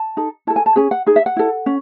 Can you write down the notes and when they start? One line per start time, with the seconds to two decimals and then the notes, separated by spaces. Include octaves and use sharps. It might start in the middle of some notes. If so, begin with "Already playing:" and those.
Already playing: A5
0.17 D#4 A4
0.47 E4 A5
0.50 A4
0.56 G#5
0.66 A5
0.76 C#4 G#4 G#5
0.91 F#5
1.06 D#4 G#4
1.16 E5
1.26 F#5
1.36 E4 A4
1.66 C#4